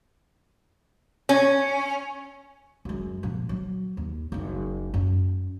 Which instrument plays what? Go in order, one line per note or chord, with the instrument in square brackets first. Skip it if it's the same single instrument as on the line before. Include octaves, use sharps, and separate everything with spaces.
[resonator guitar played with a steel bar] C#4
[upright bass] F#2 G#3
A#2 F3
F#3
D#2
F#1 D#4
F#2